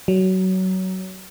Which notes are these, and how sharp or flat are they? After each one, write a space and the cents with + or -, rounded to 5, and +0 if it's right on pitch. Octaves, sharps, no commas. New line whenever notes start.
F#3 +20